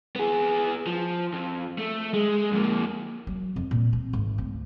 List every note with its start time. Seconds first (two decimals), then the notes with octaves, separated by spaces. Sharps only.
0.16 B3 G#4
0.87 F3
1.34 F2
1.79 A3
2.14 G#3
2.52 F2 A#3
3.27 F#3
3.56 F2
3.71 A#2
3.93 C4
4.13 G#1
4.38 D2